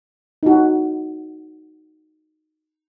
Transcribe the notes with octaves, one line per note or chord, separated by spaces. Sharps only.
D#4 F#4